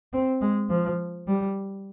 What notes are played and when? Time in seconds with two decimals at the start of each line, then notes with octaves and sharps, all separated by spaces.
0.13 C4
0.41 G#3
0.70 F3
1.27 G3